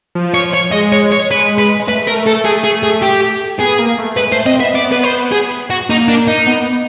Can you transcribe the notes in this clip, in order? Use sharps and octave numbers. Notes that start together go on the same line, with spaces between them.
F3
C#5
C#5
G#3 D#5
C#5
C#5
G#3 B4
B4
G#3
A3 B4
A#4
A4
G#4
G#4
G#4
G4
B3 G#4
A#3
A3
G#3 B4
A3 C5
C4 D#5
B3 E5
D5
B4
C5
G#4
F#4
A#3 D#4
D4
D#4
B3